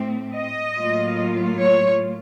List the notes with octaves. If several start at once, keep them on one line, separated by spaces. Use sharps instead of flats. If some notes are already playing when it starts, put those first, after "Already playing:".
Already playing: A2 A3 C4
D#5
A2 F#3 A#3 F4
C#5